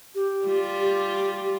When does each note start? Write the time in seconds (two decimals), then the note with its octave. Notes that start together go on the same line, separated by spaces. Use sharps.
0.15 G4
0.46 G3 F4
0.80 G4